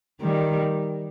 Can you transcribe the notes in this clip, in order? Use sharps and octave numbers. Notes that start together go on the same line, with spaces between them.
D#3 G3